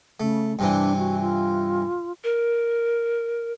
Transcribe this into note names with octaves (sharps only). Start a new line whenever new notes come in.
C#3 A3
G2 C3 E3 D4
F#4
F4
A#4